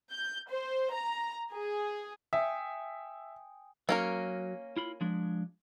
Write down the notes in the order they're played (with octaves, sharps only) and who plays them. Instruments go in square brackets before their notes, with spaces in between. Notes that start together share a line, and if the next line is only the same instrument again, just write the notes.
[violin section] G6
C5
A#5
G#4
[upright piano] E5 [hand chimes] G5 G#5 D#6
[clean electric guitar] F#3 [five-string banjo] A#3 C#4 A#4
[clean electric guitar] E4 F4 B5
F3 G#3 D4